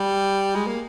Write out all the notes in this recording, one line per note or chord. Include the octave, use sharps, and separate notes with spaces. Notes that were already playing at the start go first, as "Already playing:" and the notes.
Already playing: G3
G#3
A#3